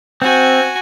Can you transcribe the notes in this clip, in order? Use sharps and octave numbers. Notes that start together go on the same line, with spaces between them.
C4 F#4 G#5